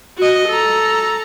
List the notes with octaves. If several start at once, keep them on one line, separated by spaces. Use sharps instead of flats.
F#4 D#5
A4 A#5